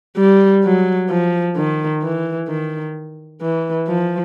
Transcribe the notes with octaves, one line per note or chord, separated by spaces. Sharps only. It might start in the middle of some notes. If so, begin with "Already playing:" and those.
G3
F#3
F3
D#3
E3
D#3
E3
F3